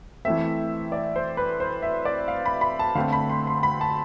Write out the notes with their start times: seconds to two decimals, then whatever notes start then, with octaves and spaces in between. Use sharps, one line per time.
0.25 E3 A3 C4 E5
0.92 D5
1.16 C5
1.37 B4
1.60 C5
1.83 E5
2.05 D5
2.28 F5
2.46 B5
2.61 B5
2.79 A5
2.95 D3 A3 C4 F5
3.12 B5
3.30 C6
3.47 C6
3.63 B5
3.81 A5